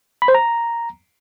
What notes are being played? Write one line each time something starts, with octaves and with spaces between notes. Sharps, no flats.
B5
C5
A#5